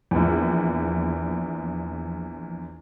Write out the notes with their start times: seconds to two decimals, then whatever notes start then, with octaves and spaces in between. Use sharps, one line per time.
0.11 A#1 E2